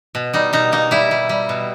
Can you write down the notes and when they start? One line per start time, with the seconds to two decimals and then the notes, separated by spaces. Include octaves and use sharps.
0.15 B2
0.33 G3 D#4
0.53 B2 D#4
0.72 A#3 D#4
0.91 G3 E4
1.11 G3
1.29 G3
1.49 B2